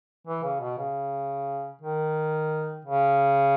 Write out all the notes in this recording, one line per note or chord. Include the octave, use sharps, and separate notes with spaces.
E3
C#3
B2
C#3
D#3
C#3